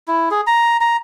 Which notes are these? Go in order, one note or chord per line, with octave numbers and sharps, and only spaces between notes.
E4
G#4
A#5
A#5